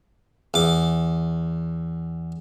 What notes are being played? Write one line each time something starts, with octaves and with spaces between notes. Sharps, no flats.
E2 D6